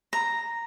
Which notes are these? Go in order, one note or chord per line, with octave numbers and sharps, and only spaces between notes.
A#5